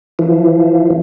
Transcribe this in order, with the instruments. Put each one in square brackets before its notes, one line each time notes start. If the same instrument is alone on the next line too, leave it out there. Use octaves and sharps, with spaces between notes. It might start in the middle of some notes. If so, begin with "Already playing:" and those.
[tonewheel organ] E3 F3